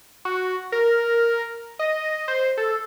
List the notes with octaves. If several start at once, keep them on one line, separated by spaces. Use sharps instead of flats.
F#4
A#4
D#5
C5
A4